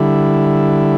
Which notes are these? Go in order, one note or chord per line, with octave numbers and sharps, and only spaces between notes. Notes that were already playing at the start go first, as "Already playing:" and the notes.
Already playing: D3 G3 E4